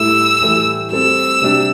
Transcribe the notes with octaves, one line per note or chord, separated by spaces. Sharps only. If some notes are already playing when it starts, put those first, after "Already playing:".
Already playing: A2 G3 E4 A4 E6
A2 E3 G3 E4 A4
G3 C4 A4 E6
C3 G3 D4 G4